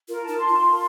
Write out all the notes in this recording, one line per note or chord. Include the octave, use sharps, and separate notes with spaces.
F4 A#4
A5
D#4
C6
F4 C6
A#4